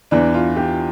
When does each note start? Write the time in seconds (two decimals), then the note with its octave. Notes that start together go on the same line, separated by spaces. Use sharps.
0.11 E2 E3 D4
0.34 F4
0.56 G4